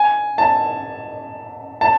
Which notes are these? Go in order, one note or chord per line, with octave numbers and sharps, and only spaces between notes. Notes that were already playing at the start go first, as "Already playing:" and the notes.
Already playing: G#5
A5
A5